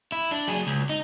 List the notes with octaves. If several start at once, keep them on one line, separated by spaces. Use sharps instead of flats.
E4
D4
F#3 G#4
C#2
D#4